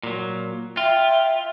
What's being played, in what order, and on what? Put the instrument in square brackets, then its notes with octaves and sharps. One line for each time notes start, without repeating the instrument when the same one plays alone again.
[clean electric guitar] A#2 F#3
[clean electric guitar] F4 [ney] E5 [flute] G5